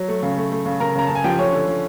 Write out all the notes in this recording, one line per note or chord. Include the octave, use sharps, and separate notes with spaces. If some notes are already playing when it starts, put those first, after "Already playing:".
Already playing: F#3
A3
C#3
A3
A3
C#3
C#3 A#4 A#5
C#3 A#5
C#3 A5
G#5
F3 G4 G5
A3 C#4 C#5
D3
D3